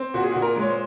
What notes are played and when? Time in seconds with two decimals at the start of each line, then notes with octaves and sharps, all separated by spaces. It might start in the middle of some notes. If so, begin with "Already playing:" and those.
Already playing: C4
0.14 A#2 F#4
0.23 G#4
0.31 F#4
0.36 A#2
0.42 A#4
0.56 G#3
0.61 C#5
0.71 C5